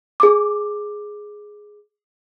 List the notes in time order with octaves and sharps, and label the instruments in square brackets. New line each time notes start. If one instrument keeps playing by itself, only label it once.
[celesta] G#4 D6